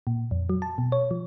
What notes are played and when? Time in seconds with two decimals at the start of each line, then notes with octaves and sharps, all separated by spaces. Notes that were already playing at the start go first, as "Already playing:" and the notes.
0.07 A#2
0.31 F2
0.49 F#3
0.62 A5
0.78 B2
0.92 C#5
1.11 F3